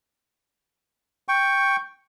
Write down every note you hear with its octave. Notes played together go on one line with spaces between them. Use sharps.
G5 C#6